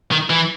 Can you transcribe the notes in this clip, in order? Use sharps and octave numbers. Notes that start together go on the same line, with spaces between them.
D#3
E3